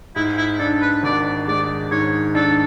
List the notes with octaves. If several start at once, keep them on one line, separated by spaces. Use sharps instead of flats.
G#2 E4
E4
D4 A4
B4
G#1 D5
G#3 D5
G#2 C#5
D4 A4